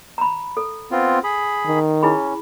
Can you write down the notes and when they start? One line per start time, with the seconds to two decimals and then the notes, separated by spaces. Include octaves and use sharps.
0.18 A#5 B5
0.57 A4
0.91 B3 C4 F4
1.24 G#4 B5
1.66 D#3
2.03 C#4 E4 G#4 B5